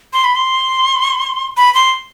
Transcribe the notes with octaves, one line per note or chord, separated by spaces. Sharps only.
C6
B5
C6
B5
C6